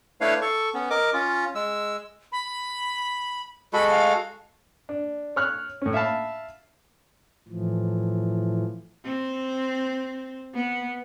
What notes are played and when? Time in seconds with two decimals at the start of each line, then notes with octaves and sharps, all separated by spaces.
0.21 A3 D4 E4 B4 C#5 F5
0.41 A4 C#6
0.74 B3 C#4
0.90 A#4 D#5 D6
1.13 C#4 F4
1.55 G#3 E6
2.32 B5
3.73 G#3 F#4 A4 B5
3.91 F5
4.89 D4
5.36 C#5 F6 F#6
5.82 A2 C#4
5.94 E5 F5 A5 B5
7.48 A2 E3 F3
9.05 C4
10.55 B3